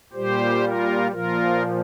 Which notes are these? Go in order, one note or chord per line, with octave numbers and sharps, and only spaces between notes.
A#2 G3 G4 C5
F4 A#4
A#2 F3 F4 A#4